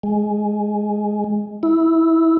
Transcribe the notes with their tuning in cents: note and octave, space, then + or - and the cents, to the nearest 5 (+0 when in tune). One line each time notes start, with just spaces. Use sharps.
G#3 +5
E4 -15